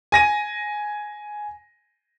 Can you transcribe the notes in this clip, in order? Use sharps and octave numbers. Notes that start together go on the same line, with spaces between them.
G#5 A#6 D#7